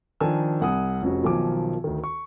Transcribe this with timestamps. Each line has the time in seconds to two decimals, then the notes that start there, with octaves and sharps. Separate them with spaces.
0.20 D#3 F3 D4 G#5 A5 E6
0.61 C2 F#5 G#5 D#6
1.02 F1 C#4 F#4
1.23 B1 B2 D#3 F3 G#5 D6
1.84 D2 D#3
2.04 C#6